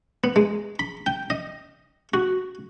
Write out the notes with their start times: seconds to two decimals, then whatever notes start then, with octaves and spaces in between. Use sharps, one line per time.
0.24 B3
0.36 G#3
0.79 B5
1.06 G5
1.30 D#5
2.14 F#4